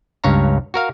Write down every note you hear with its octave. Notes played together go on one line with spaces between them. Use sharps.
C#2 G2 C#5 F5 A#5
F#4 A#4 F5